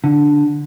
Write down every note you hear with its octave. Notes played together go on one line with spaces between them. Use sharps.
D3